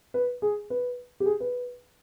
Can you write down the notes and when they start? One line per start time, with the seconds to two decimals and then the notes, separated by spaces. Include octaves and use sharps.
0.14 B4
0.42 G#4
0.70 B4
1.20 G4
1.26 G#4
1.40 B4